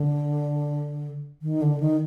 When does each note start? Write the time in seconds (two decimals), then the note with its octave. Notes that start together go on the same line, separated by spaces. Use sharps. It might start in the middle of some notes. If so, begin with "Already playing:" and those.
Already playing: D3
1.42 D#3
1.62 D3
1.80 D#3